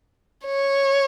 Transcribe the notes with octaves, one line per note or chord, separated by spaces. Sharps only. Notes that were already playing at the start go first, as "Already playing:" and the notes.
C#5